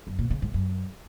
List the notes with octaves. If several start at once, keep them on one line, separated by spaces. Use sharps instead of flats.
F#2
A#2
C#3
G#2
F#2